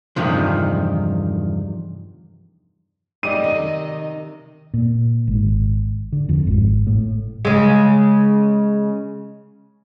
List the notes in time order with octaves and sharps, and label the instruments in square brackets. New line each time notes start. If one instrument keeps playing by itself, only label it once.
[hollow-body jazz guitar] E2 G2 C3 D#3 F3
[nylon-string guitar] G3 A3 C#4 [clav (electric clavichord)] D#4 G4 D5 [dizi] D#5 [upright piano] D#7
[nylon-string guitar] C3 D#3
[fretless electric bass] A#2
G#1
D3
F2
G#1
A2
[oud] C#3 G#3